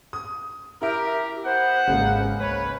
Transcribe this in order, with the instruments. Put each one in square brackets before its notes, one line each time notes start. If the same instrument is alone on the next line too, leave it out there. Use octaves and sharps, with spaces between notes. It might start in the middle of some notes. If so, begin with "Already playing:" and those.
[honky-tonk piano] D#6
[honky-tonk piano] E4 E5 [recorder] G4 [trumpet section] A#4
[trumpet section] B3 F#5 [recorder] C5
[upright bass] G#1 [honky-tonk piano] C#3 G#3 A#3
[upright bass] G#1 C#2 [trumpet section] B4 [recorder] C#5